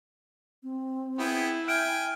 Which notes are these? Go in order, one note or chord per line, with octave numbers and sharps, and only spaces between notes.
C4
B3 E4 G#4 G5
E5 G5 G#5 F6 D7